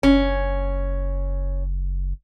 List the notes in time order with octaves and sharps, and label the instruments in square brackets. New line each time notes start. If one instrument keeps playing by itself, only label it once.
[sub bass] F#1 [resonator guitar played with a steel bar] C#4